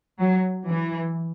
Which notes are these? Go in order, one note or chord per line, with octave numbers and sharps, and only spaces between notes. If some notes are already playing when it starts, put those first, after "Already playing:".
F#3
E3